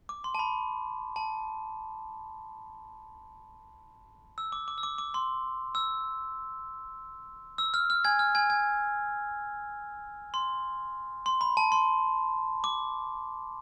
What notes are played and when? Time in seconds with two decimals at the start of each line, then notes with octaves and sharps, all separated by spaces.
0.09 D6
0.24 C6
0.35 A5
0.39 B5
1.16 A5
4.38 E6
4.52 D6
4.68 D6
4.78 E6
4.83 D6
4.98 D6
5.14 C6
5.75 E6
7.58 E6
7.74 F6
7.90 F6
8.05 G#5 G#6
8.19 F6
8.35 G#5 G#6
8.50 G#5 G#6
10.34 C6
11.26 C6
11.41 B5
11.57 A5
11.72 C6
12.64 D6